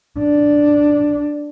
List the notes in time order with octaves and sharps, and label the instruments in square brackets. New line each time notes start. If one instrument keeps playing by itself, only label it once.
[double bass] D4